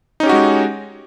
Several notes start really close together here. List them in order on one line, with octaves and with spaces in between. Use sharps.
D#4 C#4 G4 F#4 G#3